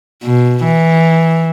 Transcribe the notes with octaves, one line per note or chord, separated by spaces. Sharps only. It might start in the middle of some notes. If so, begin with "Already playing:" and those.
B2
E3